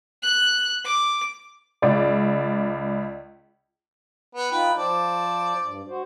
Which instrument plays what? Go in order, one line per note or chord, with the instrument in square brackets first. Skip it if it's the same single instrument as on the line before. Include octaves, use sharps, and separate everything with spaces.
[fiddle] F#6
D6
[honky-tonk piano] C#2 D5
[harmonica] B3
[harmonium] D#4 F4 G5 [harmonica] B4
[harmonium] F3 C5 A5 [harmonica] D5
[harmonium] G2
F#4 C5